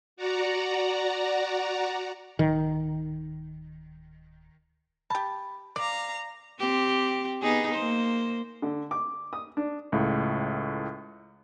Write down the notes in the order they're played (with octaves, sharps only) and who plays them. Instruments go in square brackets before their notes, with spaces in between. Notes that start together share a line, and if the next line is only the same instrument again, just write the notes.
[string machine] F#4 D5 F#5 A#5
[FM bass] D1 [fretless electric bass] D#3
[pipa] G4 A5 [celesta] B5
[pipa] D5 [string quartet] F5 A#5 [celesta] D6
[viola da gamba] C4 G4
B3 D#4 G#4
A#3 C5
[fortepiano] D3
D6
D#6
D4
[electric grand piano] C#2 A2